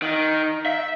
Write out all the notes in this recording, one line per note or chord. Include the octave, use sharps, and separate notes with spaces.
D#3
E5